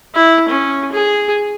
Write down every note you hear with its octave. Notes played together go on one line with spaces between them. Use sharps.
E4
C#4
G#4